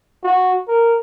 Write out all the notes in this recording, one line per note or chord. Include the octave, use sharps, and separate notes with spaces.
F#4
A#4